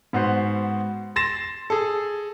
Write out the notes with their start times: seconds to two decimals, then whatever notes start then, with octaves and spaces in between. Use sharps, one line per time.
0.13 G#2 B3 F#4 C5
1.16 C6 A6 A#6 E7
1.70 G#4 A4